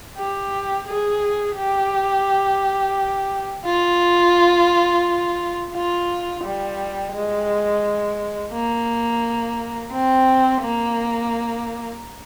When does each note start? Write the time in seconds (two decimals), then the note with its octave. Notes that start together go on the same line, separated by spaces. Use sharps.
0.17 G4
0.87 G#4
1.56 G4
3.65 F4
5.74 F4
6.43 G3
7.13 G#3
8.53 A#3
9.92 C4
10.62 A#3